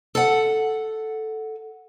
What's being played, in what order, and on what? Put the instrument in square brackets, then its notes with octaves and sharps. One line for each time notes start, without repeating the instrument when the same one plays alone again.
[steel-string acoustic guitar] A4 F#5